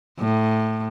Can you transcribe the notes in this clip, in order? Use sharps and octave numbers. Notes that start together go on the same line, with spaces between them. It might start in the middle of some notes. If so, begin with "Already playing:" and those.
A2